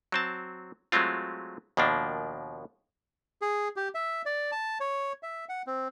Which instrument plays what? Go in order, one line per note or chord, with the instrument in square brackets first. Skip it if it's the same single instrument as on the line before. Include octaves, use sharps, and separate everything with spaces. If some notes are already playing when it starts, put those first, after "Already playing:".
[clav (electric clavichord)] F#3 C4 A5
F#3 G#3 A3 C4 F4
D#2 B2 F3 A#3 D4
[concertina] G#4
G4
E5
D5
A5
C#5
E5
F#5
C4